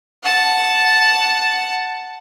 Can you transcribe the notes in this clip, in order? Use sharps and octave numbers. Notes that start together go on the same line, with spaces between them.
F#5 A5